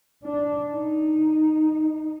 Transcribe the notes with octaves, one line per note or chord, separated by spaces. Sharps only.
D4
D#4